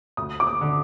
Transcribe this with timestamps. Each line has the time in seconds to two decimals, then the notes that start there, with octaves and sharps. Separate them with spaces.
0.17 D2 D#6
0.40 D6
0.47 D#6
0.61 D3